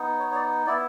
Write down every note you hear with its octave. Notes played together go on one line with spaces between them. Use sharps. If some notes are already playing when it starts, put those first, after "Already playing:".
Already playing: B3 D#4
C#5
C#5
D5
B3 E4 D5